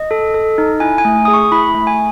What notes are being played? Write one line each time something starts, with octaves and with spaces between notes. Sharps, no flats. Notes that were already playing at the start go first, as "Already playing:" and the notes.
Already playing: D#5
A4
A4
D#4
E4 G#5
G#5
A3
G#4 D#6
C#6
E4 B5
A3
G#5